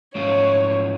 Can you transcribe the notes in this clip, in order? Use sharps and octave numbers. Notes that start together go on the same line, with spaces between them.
G#2 F3 A3 C#4 F4 C#5